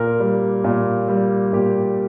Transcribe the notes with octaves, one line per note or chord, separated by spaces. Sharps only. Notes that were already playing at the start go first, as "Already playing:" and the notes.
Already playing: A#2 A#4
G3
A#2
G3
A#2 G4